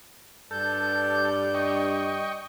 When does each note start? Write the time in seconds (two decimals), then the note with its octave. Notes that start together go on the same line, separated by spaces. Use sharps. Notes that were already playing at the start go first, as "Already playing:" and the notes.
0.51 G2 A4 D5 G6
1.54 D#5 G5 C#6